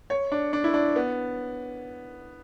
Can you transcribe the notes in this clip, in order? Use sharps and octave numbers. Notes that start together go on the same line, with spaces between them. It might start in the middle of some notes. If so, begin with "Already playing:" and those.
C#5
D4
D4
E4
D4
B3